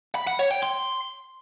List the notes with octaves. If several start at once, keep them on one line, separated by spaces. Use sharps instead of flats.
B5
F#5
C#5
G5
C6